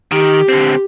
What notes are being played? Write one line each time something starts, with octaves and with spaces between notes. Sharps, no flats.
D#3 G4
D3 C4